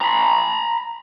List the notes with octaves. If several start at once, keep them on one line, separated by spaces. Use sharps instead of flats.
A#5 B5